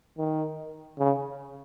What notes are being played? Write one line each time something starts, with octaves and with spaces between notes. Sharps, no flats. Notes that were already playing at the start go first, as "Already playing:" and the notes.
D#3
C#3